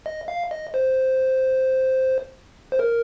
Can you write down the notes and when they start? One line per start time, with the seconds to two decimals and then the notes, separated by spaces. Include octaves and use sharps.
0.06 D#5
0.28 F5
0.51 D#5
0.74 C5
2.72 C5
2.79 A#4